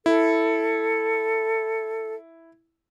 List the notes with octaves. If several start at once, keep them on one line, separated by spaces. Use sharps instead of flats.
E4 A4